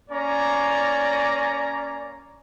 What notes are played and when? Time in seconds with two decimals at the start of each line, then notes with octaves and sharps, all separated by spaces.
0.10 A#3 C#4 D5 A#5